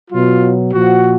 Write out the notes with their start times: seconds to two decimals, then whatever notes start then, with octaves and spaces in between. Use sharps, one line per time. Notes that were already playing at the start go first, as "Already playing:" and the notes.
0.11 B2 F#3 F4
0.73 A#2 F3 F#4